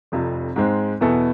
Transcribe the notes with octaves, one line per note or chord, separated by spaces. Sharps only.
F1 F2 C3 F3
G#2 G#3 C4
E2 B2 B3 E4 A4